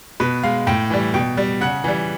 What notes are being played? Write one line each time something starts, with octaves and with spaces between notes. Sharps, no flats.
B2 B4
G#3 F5
A2 G5
E3 G3
B2 G5
G3
C#3 F#5
E3 G3